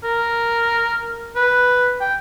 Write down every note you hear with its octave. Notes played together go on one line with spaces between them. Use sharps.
A#4
B4
G5